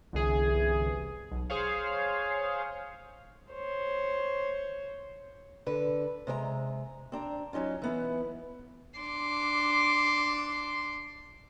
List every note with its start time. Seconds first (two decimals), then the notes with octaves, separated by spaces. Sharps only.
0.13 G1 C2 E3 G#4
1.31 B1
1.50 G#4 C5 C#5 F5
3.51 C5 C#5
5.66 D3 B4
6.27 C3 G#3 D5 A#5
7.12 C4 D4 A#5
7.53 F#3 C#4 D#4 F4
7.82 E3 B3 E4
8.99 D4 C6 D6